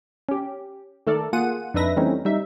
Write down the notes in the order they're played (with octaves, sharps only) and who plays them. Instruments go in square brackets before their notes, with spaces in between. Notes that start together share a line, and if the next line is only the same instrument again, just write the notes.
[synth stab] C#4 G4
D#3 A3 A4 A#4 D5
A#3 F4 G#4 F#5 D#7
F2 D4 D#4 B4 E5 A#6
E3 G3 A3 C4 C#4 D#4
G3 D#4 E5